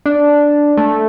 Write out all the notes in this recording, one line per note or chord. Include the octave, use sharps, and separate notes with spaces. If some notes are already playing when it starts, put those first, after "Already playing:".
D4
A3